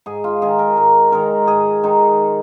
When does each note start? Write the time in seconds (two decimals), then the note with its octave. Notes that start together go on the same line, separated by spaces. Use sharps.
0.06 G#2 G#4
0.24 F4
0.42 D#3 G#3 D#4 G#4
0.59 A#4
0.77 G#2 A#4
1.12 D#3 G#3 D#4 A#4
1.47 G#2 G#4
1.83 D#3 G#3 D#4